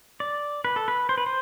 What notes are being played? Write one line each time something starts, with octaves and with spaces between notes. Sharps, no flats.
D5
B4
A4
B4
C5
B4
C5